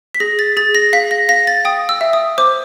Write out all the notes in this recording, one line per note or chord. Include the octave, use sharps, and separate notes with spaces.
B6
G#4 A#6
A6
G#4 A6
A#6
F5 B6
A#6
F5 A#6
A6
G5 D#6
E6
E5
D#6
C5 D6